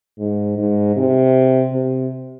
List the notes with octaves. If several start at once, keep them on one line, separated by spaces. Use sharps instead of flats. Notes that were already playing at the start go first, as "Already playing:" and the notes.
G#2
G#2
C3
C3